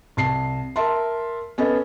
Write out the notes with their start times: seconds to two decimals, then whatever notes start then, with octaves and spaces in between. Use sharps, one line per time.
0.17 C2 A5 C7
0.76 A#4 E5 A5 C6
1.58 B3 C#4 A4 D#5